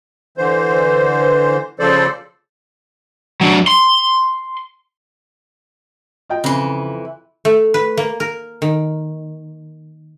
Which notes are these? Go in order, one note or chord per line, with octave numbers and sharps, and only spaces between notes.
D3 E3 C5
C#3 F3 A4 C5 D5
F#3 D4
C6
F4 D#5 G5
F2 C#3 E3
A3
B4
A#3
A#4
D#3